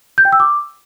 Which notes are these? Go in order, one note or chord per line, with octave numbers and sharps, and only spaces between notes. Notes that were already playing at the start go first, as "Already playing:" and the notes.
G6
G5
E6
D6